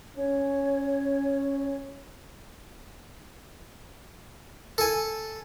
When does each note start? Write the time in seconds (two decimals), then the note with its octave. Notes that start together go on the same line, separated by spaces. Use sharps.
0.17 C#4 C#5
4.78 A4 G#5